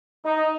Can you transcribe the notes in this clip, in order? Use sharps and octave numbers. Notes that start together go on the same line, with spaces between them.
D#4